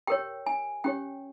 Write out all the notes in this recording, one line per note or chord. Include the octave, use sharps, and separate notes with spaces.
G4 A#4 C#5 G5
G#5
C#4 G4 C#5 G5